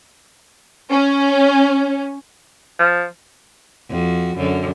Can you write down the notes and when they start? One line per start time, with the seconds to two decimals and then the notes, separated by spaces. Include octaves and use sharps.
0.90 C#4
2.79 F3
3.89 F2 F#4
4.36 F#2 D3